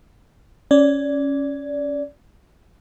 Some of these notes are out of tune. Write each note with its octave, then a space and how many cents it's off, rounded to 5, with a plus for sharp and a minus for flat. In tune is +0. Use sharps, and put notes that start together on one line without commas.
C#4 +0 D5 -15